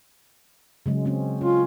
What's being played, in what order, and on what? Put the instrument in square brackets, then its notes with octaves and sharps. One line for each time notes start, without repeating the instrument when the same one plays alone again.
[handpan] C#3 F#3 G#3
G#3 C4 C#4
[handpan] C#4 [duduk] F4